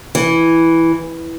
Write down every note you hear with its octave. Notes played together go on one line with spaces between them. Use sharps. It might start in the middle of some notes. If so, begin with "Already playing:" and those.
E3